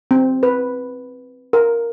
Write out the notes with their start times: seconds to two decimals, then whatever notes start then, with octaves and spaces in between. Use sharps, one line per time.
0.11 C4
0.43 B4
1.53 A#4